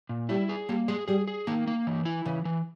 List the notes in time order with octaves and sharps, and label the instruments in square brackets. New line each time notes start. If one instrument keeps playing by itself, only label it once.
[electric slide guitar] A#2
[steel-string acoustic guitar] G3 [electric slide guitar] E4
[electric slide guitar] G#4
[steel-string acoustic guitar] G3 [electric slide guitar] A#3
[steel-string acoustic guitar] G#3 [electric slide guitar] G#4
[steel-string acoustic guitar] G3 [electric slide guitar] G#4
[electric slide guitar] G#4
[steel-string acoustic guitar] D#3 [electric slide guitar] A#3
[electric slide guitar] A#3
E3
E4
[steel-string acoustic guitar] C#3 [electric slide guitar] E3
[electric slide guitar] E3